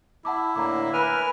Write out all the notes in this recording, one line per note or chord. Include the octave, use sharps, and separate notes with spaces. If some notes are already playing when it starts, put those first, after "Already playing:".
E4 F#5 A5 D6
A2 D3 A#3 A#5 D6
A#4 B4 G#5 F6